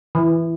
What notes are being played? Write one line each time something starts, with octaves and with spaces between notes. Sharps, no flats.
E3